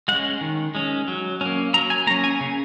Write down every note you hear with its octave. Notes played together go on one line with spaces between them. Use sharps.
G#3 C#4 F#5
D#3
G#3 C#4
F#3
A#3 C#4
F#3 A#5
G#5
A#3 C#4 A#5
G#5
C#3